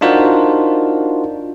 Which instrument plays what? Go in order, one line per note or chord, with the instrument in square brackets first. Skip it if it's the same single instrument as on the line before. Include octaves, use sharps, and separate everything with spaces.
[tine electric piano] D4 D#4 F4 F#4 A#4 C5